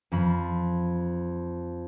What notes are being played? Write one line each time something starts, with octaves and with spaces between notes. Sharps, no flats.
F2 F3 B5